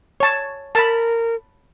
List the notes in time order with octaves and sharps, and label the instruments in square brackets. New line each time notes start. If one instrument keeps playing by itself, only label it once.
[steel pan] C#5 A5
[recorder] A#4 [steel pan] A5 B5